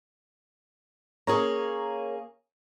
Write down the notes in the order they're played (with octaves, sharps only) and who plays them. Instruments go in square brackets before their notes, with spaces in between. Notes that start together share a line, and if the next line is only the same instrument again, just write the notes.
[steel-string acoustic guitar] A#3 C#4 G#4 [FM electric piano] A#4 C#5 A#5